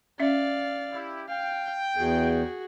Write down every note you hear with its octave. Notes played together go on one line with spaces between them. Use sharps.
C#4 D5 E5 F5
E4 G4
F5 G5
E2 F#4 G#4